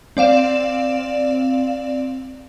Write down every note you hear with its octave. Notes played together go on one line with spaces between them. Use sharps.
C4 D5 F5 E7